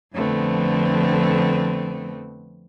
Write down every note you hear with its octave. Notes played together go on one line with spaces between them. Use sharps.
F2 D3 F3 A3 B3 C4